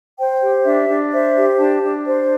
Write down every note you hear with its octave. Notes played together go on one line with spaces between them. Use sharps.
C5 G5
G4
D4 E5
D4
C5 E5
G4
D4 A5
D4
C5